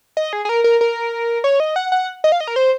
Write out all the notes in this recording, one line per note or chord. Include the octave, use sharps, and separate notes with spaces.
D#5
G#4
G#4
A#4
A#4
A#4
C#5
D#5
F#5
F#5
D#5
F5
D#5
A#4
C5